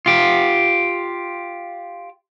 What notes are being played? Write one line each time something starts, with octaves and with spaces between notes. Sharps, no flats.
F4 G4